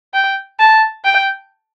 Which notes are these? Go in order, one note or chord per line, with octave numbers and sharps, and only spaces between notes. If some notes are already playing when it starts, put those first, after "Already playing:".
G5
A5
G5